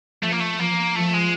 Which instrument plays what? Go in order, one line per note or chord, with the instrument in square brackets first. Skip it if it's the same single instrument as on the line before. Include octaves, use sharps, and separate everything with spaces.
[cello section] F3 [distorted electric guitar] A3
[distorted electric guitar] A#3
A3
[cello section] F3 [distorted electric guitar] A#3
[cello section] F3 [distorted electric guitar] A3
[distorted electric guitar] G#3